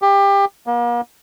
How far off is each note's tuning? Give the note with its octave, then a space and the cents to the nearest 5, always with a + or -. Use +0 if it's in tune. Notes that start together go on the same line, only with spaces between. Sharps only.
G4 +25
A#3 +40